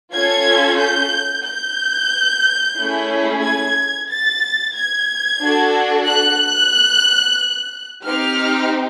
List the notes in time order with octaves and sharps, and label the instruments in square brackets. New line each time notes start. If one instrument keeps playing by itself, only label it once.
[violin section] C#4 F4 A4 G#6
G6
G6
A3 C#4 E4 G#4
G#6
A6
G#6
D4 F#4 A4
F#6
C4 D#4 G4 F6